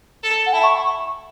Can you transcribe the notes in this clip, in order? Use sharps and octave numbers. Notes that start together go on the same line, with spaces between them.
A4
F#5
E4 A5
C#6